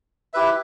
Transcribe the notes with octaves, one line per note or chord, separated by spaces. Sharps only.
E4 G4 B4 E5